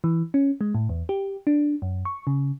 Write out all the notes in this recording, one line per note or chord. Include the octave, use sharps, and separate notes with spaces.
E3
C#4
G#3
A2
E2
G4
D4
F#2
C#6
C#3